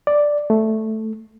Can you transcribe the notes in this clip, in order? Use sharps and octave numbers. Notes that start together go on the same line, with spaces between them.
D5
A3